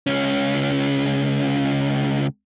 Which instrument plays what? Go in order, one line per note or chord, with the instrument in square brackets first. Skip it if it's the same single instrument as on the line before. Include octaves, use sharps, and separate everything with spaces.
[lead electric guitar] C#2 C#4